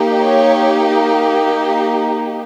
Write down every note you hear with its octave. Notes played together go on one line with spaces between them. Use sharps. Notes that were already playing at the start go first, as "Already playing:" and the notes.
Already playing: A#3 D#4 G4
C#5